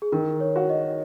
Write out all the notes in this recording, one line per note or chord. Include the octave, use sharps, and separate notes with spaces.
G#4
D#3 A#4
C#5
F#4
D#5